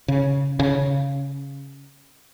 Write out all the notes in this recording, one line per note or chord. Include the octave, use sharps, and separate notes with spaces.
C#3
C#3